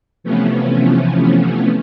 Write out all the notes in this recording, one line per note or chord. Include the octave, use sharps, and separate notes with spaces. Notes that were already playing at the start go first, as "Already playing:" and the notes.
C3 E3 F3 A3 B3 C#4